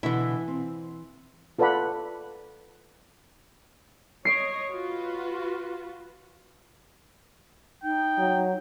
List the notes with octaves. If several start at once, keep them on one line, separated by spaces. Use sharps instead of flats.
B2 D3 E3 E4
C4
F4 A4 B4 D5 F#5 B5
C#5 D#5 C7 D7
F4 F#4 B4
D#4 G5
F#3